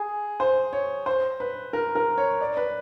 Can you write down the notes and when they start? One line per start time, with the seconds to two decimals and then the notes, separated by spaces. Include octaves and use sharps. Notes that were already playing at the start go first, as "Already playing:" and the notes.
Already playing: G#4
0.40 C5
0.73 C#5
1.06 C5
1.40 B4
1.73 A#4
1.95 A#4
2.18 C#5
2.41 D5
2.57 B4